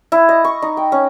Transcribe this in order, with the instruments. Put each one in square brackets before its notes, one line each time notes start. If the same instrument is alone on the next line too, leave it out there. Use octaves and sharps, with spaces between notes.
[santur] E4
D#5
C#6
D#4
G5
C#4